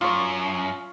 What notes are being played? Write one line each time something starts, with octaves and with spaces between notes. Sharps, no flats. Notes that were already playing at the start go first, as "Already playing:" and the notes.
F#2 F4 C#5